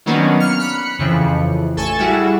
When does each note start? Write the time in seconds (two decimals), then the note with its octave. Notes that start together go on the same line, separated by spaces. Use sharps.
0.06 D#3 F#3 A#3 B3 C#4 D4
0.40 F6 C#7
0.59 B5 F#6 C#7
0.99 F2 C#3 E3 F3
1.76 A1 A4 G#5 C#6 A6 E7
1.99 G3 E4 F#4 G#4